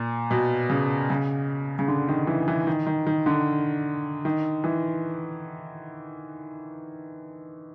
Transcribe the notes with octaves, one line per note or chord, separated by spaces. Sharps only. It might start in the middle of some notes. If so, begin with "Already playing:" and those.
Already playing: A#2
B2
C#3
C#3
C#3
D3
D#3
E3
E3
D#3
D#3
D#3
D3
D#3
E3